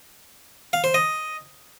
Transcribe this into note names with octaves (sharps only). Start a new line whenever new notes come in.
F5
C5
D#5